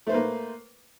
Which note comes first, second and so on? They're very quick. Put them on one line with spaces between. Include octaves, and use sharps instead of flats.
A3 C5 B4 A#3